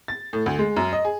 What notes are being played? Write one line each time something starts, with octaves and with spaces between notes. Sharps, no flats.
A6
A2
D2
G#3
F#2
D#5
G#4